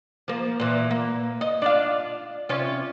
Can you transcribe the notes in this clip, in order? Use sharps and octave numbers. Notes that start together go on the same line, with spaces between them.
F3 A#3
A#2 E3
A#3
D#5
D4 F4 F5
C3 C#4 F4